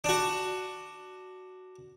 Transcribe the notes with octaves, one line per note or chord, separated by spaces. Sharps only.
D4 F#4